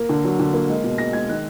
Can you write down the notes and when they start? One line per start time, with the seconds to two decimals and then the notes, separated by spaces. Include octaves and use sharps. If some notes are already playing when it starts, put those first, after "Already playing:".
Already playing: A#3
0.09 D3
0.24 F#3
0.39 D3
0.54 A#3
0.69 G#3
0.84 B2
0.98 G#3 A#6
1.13 G#3 G#6
1.29 D#3 F#6